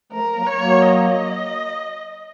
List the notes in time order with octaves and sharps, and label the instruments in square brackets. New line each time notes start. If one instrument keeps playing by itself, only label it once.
[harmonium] F3 A3 [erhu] A#4
[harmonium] F#3 A#3
[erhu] C#5
[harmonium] F#3 A#3
[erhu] D#5